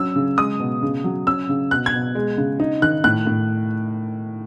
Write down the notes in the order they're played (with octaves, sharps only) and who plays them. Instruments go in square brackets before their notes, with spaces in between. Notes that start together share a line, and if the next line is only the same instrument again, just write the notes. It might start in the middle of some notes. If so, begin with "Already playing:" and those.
Already playing: [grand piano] F#3 C#4 E6
C#3
G#3 D#6
B2
C#3
F#3
C#4 E6
C#3
B2 F#6
G#6
B2
G#3
C#3
D#4
D#3 F#6
A2 F#6
A2